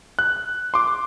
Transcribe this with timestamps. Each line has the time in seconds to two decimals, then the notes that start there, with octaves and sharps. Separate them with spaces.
0.19 F#6
0.74 C6 D6